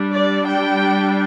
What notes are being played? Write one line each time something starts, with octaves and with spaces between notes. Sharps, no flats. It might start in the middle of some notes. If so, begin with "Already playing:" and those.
Already playing: G3 D4
D5
G5